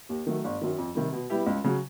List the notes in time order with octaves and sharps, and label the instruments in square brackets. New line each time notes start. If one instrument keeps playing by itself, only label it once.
[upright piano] D#2
D#3 F#3 A3
G1
F#2 D#3
F2
C3 D#3 G3
B2
G3 B3 E4 G4
C#2
C#3 F#3